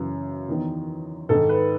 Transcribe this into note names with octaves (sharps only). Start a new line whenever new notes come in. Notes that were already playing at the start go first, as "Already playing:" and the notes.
Already playing: F#2 C#3 E3
E2 D#3
G#2 D#3 A4
B4